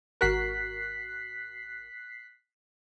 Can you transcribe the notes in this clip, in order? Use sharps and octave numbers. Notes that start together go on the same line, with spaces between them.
G#1 F#4 A#4 F#6 B6 C7